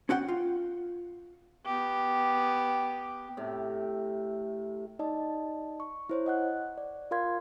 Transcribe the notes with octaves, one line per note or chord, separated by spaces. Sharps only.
C#4 F#4 F#5 G5
F4
B3 G4
A2 C3
D#4 D5 D#5 A5
C#6
E4 C5 C#5
D#5 F#5 F#6
D5
F4 A#4 F5 C6 G#6